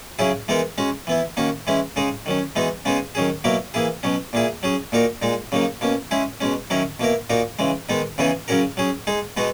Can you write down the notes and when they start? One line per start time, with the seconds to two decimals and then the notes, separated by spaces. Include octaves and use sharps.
0.19 C#3 F#3 C#4 E4 G#4
0.48 E3 G#3 B3 D#4 A#4
0.78 G#3 C#4 F#4
1.07 E3 B3 E4
1.37 D#3 A#3 C#4 F#4
1.67 E3 G#3 C#4 E4
1.96 C#3 G#3 D#4 G#4
2.26 D#3 F#3 C#4
2.56 E3 G#3 B3 D#4 F#4
2.85 C#3 G#3 B3 D#4 G#4
3.15 D#3 F#3 C#4 G#4
3.44 B2 F#3 A#3 E4 A#4
3.74 E3 A#3 E4 G#4
4.03 B2 F#3 C#4
4.33 A#2 A#3 E4 G#4
4.63 F#3 C#4 G#4
4.92 A#2 A#3 D#4 F#4 A#4
5.22 A#2 G#3 D#4
5.52 C#3 F#3 A#3 D#4
5.81 B2 A#3 C#4
6.11 G#3 C#4 E4 G#4
6.41 B2 G#3 C#4
6.70 D#3 F#3 C#4 E4 A#4
7.00 B2 A#3 E4 A#4
7.30 A#2 A#3 D#4 F#4 A#4
7.59 C#3 E3 G#3
7.89 D#3 G#3 B3 D#4
8.18 C#3 E3 B3 D#4 G#4
8.48 C#3 F#3 C#4 F#4 A#4
8.77 F#3 C#4 G#4
9.07 G#3 D#4 G#4
9.37 B2 G#3 B3 D#4 F#4